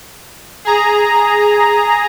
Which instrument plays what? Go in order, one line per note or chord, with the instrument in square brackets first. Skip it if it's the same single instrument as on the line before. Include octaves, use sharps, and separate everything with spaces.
[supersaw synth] G#4 A#5